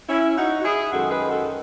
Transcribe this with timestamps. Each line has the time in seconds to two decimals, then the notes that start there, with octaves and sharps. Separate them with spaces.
0.09 C#4 E4
0.37 D#4 F#4
0.60 F#4
0.64 E4 G#4
0.92 F#2 D#3 G#3 F#4 A4
1.10 G#4 B4
1.30 F#4 A4